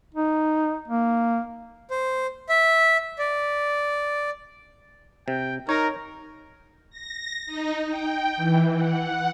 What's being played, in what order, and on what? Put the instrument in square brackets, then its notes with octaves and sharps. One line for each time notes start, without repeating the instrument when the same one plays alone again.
[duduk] D#4
A#3
[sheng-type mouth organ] C5
E5
D5
[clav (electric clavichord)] C3 [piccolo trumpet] G5
[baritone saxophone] D#4 [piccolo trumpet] A#4 [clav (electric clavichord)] C#5
[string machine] A#6
D#4
G5
E3
F#5